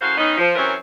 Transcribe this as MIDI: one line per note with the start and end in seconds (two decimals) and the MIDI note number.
0.01 0.15 42
0.01 0.15 45
0.01 0.15 66
0.01 0.15 72
0.01 0.15 77
0.17 0.34 51
0.17 0.34 59
0.17 0.34 61
0.17 0.34 63
0.37 0.55 53
0.55 0.73 42
0.55 0.73 52
0.55 0.73 60
0.55 0.73 70
0.55 0.73 72
0.55 0.73 73